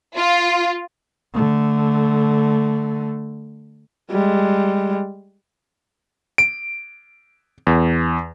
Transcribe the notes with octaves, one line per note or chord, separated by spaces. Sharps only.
F4
D3 A3
G3 G#3
D7
E2